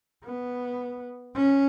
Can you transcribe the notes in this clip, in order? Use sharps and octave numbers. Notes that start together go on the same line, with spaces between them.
B3
C#4